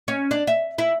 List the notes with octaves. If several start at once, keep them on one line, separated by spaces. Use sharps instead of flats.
C#4
D4
E5
E4